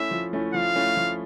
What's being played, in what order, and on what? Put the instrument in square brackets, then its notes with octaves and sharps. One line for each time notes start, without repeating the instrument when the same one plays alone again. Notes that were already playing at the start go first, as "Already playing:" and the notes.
Already playing: [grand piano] A3 C#4 E4 [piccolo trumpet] E5
[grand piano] F3
A3 C#4 E4
[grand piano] F3 [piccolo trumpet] F5
[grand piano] A3 C#4 E4
F3